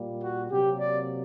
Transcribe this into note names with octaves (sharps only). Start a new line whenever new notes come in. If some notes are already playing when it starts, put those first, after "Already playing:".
Already playing: A#2 G3 A#3
F#4
C3 F#3 A#3 G4
D5